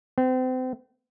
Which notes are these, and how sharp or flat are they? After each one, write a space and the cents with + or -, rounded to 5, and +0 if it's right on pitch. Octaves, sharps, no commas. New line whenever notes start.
C4 -35